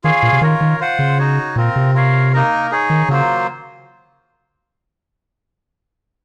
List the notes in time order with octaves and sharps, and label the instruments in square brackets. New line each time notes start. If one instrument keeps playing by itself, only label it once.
[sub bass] D#3 [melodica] F4 G#4 C#5 F5
[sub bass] A#2
C3
[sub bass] D#3 [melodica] F4 A#4 C#5
[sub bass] D#3
[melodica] F4 C5 F#5
[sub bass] C#3
[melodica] D#4 F#4 C#5
[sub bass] A#2 [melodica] C4 F4 A#4
[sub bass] C3
[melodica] F4 A#4 C#5 F5
A#3 D#4 A#4
D#4 G#4 C#5
[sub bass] D#3
[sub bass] C#3 [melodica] F#3 A#3 F4 C5